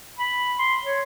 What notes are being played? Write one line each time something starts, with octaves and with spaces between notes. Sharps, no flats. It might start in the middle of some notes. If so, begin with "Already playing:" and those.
B5
C6
C#5